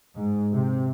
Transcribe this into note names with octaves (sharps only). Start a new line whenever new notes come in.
G#2
C3